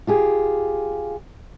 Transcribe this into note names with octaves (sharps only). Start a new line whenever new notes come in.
F4 G4 G#4